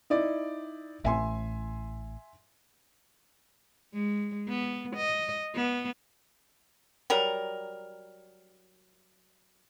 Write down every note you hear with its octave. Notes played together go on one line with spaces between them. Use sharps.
D#4 E4 D5
A1 A2 E5 G#5 C6
G#3
B3
D#5
B3
F#3 G3 A#4